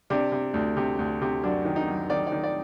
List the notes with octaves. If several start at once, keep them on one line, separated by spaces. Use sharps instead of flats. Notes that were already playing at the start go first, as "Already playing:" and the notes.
C3 D4
C3
D2
C3
D2
C3
F#2 D4
D#3
D#4
F#2
D#3 D5
D5
D#3
D5